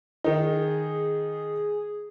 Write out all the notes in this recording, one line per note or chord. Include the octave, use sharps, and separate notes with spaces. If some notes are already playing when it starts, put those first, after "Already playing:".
D#3 D#4 G#4